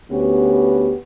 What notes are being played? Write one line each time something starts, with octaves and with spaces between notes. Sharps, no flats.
D2 B3 C#4 F#4 G4 B4